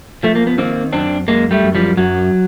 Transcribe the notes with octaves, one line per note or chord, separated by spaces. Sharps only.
F3 A3
A#3
B3
D#3 A#3 C4
F#2 C4 D4
F#2 G#3 A#3
G3 A3
F#2
F3 G3
F#2 F#3